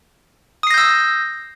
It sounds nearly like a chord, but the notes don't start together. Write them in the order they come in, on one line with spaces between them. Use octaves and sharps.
D#6 C7 A#6 G6 E6